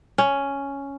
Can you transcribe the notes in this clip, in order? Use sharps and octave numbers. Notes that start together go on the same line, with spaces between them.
C#4